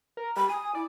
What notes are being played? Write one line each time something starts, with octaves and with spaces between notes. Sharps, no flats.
A#4
G3 B5
G#5 D#6
E4 D5